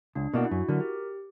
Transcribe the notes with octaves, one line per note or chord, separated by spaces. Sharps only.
C#2 D4
B2 A#3 D4 E4 F#4
E4
F#2 F#4
D3 F#3 A#4
G4